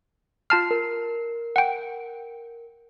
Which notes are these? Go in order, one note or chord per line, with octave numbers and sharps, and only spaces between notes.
F4 A5 F6 C7
A#4
F#5 G5